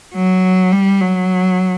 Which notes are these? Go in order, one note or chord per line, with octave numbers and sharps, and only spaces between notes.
F#3
G3
F#3